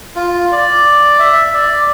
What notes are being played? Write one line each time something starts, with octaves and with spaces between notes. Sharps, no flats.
F4
D5
E5
D5